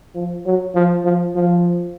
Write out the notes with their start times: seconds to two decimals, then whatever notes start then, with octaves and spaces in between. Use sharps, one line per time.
0.15 F3
0.46 F#3
0.75 F3
1.05 F3
1.35 F3